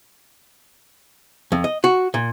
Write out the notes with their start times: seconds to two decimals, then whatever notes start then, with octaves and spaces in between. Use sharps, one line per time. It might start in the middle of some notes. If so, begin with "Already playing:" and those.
1.52 F2
1.64 D#5
1.84 F#4
2.14 A#2